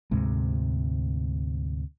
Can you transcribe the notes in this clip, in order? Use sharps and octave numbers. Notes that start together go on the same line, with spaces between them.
D2 G#2 C3 G#3